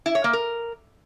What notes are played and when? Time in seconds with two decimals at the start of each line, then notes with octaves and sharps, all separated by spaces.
0.06 E4
0.15 C#5
0.24 A#3
0.33 A#4